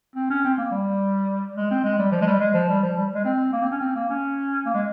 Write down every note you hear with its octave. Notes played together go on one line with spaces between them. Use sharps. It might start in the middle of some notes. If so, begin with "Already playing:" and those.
C4
C#4
C4
A#3
G3
G#3
C4
G#3
G3
F3
G#3
G3
G#3
F3
G3
F3
G3
G#3
C4
A#3
C4
C#4
C4
A#3
C#4
A#3
G#3